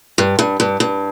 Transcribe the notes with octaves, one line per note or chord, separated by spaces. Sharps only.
G2
G2
G2
G2